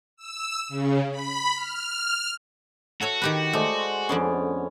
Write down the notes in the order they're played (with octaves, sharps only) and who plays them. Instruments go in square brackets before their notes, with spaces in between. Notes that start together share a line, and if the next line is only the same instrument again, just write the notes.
[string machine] E6
C#3
B5
F6
[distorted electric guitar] F#4 [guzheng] A4 C#5 E5
[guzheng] D#3 G4 B4
[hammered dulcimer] G#3 C5 D5 [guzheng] A3
[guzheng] F2 D5 C6 [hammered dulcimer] D3 B3 C#4